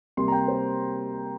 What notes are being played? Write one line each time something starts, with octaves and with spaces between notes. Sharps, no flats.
C3 G3 A#3 C6
A#5
G5
C5